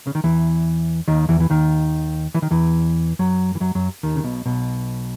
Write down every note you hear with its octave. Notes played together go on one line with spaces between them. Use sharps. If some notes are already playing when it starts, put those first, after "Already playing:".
C#3
D#3
E2 E3
D#2 D#3
E2 E3
E3
D#2 D#3
E3
D#3
E2 E3
F#2 F#3
E3
F#2 F#3
F#2 F#3
D#2 D#3
C#3
B1 B2
B1 B2